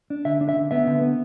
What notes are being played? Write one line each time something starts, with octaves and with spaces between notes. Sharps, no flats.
D4
D3 E5
D4
E5
D3
B3 E5
D3
B3